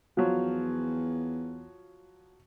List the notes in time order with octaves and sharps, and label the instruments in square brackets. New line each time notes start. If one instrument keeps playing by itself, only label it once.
[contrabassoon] E2 [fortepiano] F3 F#3